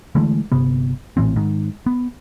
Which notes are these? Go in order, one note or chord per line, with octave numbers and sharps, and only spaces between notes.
D3 E3 G#3 A3
G1 C3 B3
A#1 A2 E3 C4
G#2 D#3
B3